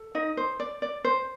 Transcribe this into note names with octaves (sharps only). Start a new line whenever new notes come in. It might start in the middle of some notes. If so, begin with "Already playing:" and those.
Already playing: A4
D#4 D#5
C5
D5
D5
C5